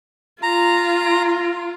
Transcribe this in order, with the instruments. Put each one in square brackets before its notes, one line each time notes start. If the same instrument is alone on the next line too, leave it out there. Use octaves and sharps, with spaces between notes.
[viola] F4 [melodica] A#5